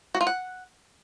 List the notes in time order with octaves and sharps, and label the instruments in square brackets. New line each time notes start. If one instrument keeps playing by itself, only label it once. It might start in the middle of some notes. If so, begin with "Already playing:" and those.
[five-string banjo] F#4
F4
F#5